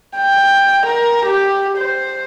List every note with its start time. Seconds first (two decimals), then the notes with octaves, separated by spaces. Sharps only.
0.17 G5
0.87 A#4
1.26 G4
1.78 C5